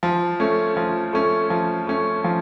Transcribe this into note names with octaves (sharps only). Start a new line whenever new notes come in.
F3
A3 C#4
F3
A3 C#4
F3
A3 C#4
F3